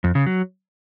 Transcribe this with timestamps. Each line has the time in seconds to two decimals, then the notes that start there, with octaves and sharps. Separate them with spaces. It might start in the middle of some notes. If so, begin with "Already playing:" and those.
0.04 F2
0.15 C#3
0.26 F#3